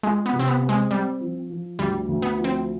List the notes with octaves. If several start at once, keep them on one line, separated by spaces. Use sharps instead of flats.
G#3 F4
B3
C3
C4
B3
C4
G#3
G3 C4
F3
F3
D2 G3
D2
B3
F3
C4